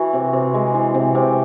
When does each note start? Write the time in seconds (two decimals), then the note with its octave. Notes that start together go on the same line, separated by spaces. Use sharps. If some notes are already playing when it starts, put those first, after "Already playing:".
Already playing: E3 E4 F#4
0.13 C3
0.33 C3
0.54 G#3
0.74 E3
0.94 C3
1.15 C3